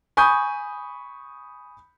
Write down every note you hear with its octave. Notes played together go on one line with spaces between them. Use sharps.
G#5 B5 C#6 D#6 G6